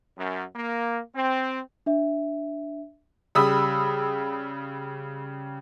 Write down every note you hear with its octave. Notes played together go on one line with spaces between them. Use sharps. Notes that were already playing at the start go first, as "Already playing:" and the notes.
F#2
A#3
C4
D4 E5
C#3 G3 B5 D#6 E6